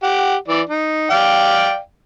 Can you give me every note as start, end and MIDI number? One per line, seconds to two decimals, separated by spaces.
0.03 0.35 67
0.03 0.35 78
0.48 0.61 52
0.48 0.61 74
0.69 1.10 63
1.10 1.78 74
1.10 1.78 77
1.10 1.78 79